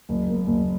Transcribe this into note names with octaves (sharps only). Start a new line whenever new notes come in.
F#1
A#3
F#1